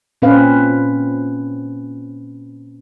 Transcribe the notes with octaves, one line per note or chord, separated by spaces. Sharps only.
A#2 C4 C#4 B4 F5